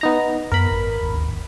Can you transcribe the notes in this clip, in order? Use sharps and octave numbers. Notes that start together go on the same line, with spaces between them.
B3 D#4 A#5
F#2 B3 A#4 B5
G#1
D1 G#1 D#2